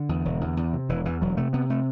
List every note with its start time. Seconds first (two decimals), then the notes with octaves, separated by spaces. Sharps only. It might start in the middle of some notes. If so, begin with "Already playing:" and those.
Already playing: D3
0.09 E2
0.25 E1
0.41 E2
0.57 E2
0.73 C3
0.89 E1 E3
1.05 E2 E3
1.21 E1 F#3
1.37 C3 A3
1.53 C3 B3
1.70 C3 A3